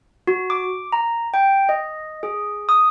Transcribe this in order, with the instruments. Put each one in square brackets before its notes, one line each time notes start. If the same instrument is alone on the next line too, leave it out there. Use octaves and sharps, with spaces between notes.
[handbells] F#4
D6
A#5
G5
D#5
G#4
D#6